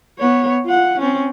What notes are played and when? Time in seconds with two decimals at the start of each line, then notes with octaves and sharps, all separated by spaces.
0.18 B3 C#5
0.66 F4 F#5
0.99 C4 C#4